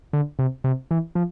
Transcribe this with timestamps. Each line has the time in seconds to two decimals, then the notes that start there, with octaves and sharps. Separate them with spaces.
0.13 D3
0.39 C3
0.64 C3
0.91 E3
1.15 F3